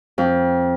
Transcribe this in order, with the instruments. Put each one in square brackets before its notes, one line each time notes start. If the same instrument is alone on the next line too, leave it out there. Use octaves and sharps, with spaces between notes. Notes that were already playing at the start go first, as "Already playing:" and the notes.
[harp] F2